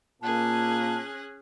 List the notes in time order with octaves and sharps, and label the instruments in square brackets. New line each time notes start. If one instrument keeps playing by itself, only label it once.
[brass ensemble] A#2 A#3 [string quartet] C#4 G#4 F#6 [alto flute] A5